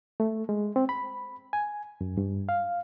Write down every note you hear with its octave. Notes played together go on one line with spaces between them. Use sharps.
A3
G#3
C4
B5
G#5
F#2
G2
F5